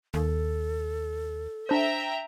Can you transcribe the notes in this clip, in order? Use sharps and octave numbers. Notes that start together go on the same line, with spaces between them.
D#2 A4
D4 C5 E5 G5 A#5